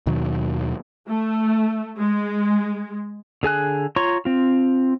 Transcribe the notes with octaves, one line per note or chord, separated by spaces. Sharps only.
D#2 B2 D#3 F#3
A3
G#3
D3 G#4 G#5 F#6
F4 C#5 A#5 C6 C#6
C4 F4